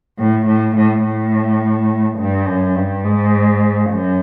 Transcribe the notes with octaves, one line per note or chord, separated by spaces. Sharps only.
A2
A2
A2
A2
G2
F#2
G2
G#2
F#2